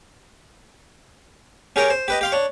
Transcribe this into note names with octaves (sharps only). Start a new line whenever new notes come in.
C#4 G4 G#4 A#4 C#5 G5
C5
G4 B4 D#5
G4 F5 C6
D4 C#5